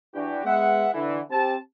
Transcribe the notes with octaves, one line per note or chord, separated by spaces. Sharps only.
E3 D4 F#4 G4
G#3 B3 E5 F#5
D3 E3
C4 G4 A5